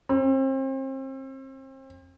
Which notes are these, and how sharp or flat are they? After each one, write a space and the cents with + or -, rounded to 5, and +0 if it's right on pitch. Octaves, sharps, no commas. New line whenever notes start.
C4 +35